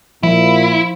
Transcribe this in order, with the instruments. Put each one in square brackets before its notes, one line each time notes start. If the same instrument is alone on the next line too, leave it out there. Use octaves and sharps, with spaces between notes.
[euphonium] A#2 [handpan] F3 [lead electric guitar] E4